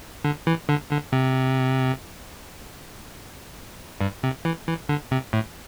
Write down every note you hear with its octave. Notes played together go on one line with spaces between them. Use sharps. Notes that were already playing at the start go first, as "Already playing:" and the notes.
D3
E3
D3
D3
C3
G2
C3
E3
E3
D3
C3
A2